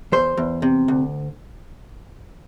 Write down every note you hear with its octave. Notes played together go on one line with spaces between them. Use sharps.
E2 C5
E2
C3
D2